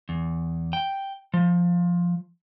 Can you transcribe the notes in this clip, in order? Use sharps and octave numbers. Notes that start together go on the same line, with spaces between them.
E2
G5
F3